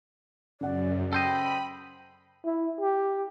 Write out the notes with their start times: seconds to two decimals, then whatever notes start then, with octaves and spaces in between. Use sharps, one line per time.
0.61 F#2 C#3 D5 F#5
1.13 A4 C5 D#5 G5 B5
2.45 E4
2.81 G4